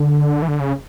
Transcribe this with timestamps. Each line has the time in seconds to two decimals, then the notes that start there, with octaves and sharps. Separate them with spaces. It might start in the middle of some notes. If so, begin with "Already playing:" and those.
Already playing: D3
0.42 E3
0.48 D3
0.60 C#3